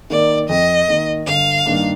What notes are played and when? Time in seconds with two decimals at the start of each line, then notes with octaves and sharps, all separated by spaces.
0.10 D#3 A#3 D5
0.49 F2 D#5
0.88 D#3 A#3
1.26 G1 F5
1.66 G2 D#3 A#3 D4